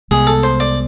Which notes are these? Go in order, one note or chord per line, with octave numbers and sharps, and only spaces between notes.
C2 C3 G#3 B3 G#4
A4
C5
D5